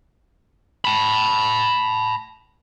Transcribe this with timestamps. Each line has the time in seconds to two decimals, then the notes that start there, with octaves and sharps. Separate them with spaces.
0.85 A5 B5